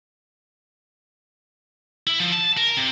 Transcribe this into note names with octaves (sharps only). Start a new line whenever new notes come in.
E4
F3
A5
A#4
C3